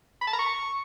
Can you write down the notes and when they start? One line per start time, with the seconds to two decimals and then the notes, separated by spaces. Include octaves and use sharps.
0.21 B5
0.27 A5
0.33 A#5
0.39 C#6